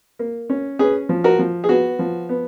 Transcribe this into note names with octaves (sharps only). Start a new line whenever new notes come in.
A#3
C#4
C#4 G#4 B4
F3
F#4 A#4
F3
G#4
B3 F#4
F3
B3